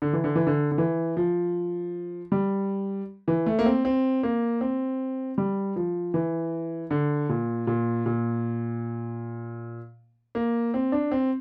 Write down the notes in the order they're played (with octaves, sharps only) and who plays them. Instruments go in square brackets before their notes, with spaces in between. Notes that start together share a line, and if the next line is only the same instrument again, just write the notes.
[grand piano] D3
E3
D3
E3
D3
D3
E3
F3
G3
E3
A3
A#3
C4
C4
A#3
C4
G3
F3
E3
D3
A#2
A#2
A#2
A#3
C4
D4
C4